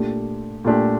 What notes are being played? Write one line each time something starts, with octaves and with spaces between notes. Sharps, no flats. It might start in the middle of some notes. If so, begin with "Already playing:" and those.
Already playing: A#2 A3 D4 G4
A#2 A3 D4 G4